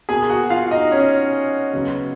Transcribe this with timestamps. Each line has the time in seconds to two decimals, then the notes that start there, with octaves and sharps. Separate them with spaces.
0.09 B2 A#3 G#4 G#5
0.30 F#4 F#5
0.50 F4 F5
0.71 D#4 D#5
0.91 C#4 C#5
1.73 C#3 F#3 B3